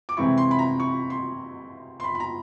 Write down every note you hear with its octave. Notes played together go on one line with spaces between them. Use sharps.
D6
C3 E3 G#3 C4 E4 C#6
C6
B5
A#5
C#6
C6
C6
B5
B5
A#5